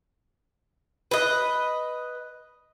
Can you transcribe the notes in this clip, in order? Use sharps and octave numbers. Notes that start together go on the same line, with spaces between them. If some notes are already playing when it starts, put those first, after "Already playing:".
B4 D#5